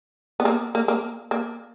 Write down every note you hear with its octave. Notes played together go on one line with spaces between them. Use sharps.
B3
A#3
A#3
A#3
A#3